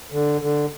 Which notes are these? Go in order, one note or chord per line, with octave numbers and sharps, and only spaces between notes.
D3
D3